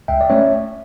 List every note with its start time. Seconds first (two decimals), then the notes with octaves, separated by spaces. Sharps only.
0.08 C#2 E5 G5
0.21 D5
0.29 A3 C#4 C#5 E5